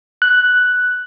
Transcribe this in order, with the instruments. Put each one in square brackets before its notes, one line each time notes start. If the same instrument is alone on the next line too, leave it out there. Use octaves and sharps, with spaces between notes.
[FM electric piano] F#6